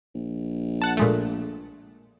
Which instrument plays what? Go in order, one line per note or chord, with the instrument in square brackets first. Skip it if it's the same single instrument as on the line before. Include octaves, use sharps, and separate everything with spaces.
[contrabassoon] A#1
[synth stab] F#5 A5
A#2 G#3 A3